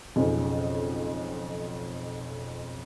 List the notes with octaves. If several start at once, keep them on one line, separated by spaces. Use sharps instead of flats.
B1 F2 C#3